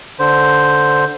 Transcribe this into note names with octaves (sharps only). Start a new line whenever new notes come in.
D3 C5